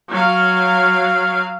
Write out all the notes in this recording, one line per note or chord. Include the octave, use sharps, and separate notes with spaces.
F#3 F5